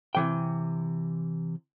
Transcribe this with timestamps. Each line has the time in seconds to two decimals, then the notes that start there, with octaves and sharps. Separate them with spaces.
0.15 C3 E3 G5